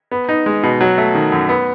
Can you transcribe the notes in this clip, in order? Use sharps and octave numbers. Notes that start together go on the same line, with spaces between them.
B3
D#4
G#3
B2
F#3
A3
D#3
F#2
B3